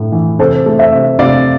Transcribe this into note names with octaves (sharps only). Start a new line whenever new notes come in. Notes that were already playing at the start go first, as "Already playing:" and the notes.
Already playing: A2 A3
E3
C3 A4 C5
A3
C5 E5
C3
C3 D5 F5